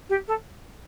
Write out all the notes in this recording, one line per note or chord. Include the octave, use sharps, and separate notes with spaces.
G4
A4